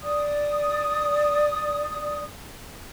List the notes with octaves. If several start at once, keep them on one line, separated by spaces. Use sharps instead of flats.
D5 D#6